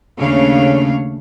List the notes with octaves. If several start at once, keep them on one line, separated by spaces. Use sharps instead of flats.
D#2 C#3 A3 D4 C#5 F5